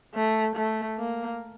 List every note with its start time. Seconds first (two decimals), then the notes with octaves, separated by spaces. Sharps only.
0.15 A3
0.56 A3
0.98 A#3